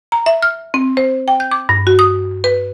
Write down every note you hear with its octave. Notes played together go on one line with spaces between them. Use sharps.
A#5
E5
F6
C4
C5
G5
G6
D6
G2
F#4
D#6
B4